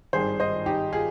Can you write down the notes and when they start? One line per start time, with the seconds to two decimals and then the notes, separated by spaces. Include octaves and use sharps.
0.13 G#1 G2 D#3 G#4 C5
0.40 C5 D#5
0.66 D#4 G4
0.92 F4 G#4